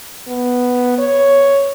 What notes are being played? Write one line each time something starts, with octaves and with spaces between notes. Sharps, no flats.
B3
C#5